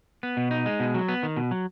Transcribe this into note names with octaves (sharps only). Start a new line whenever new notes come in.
B3
B2
D#4
G#3
B2
F#3
B3
D#3
B2
F#3